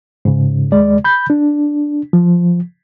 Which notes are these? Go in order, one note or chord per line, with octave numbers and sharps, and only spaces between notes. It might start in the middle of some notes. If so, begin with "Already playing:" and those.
G#2 C#3
D#2 G#3 D5
B5 G6
D4
F3